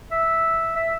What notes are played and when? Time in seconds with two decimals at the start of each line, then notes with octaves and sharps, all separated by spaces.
0.11 E5
0.76 E5